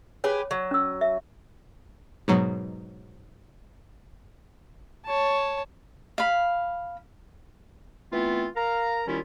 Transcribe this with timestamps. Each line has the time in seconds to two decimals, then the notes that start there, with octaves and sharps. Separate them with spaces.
0.24 G4 G#4 B4 C#5
0.51 F#3
0.71 C#4 E6
1.01 E5
2.28 G#2 B2 F#3
5.05 C#5 A5
6.18 F5 B5
8.12 E3 A3 B3 C4 F4
8.56 A#4 F5 A#5
9.07 D#2 D#3 G3 C#4 E4 F4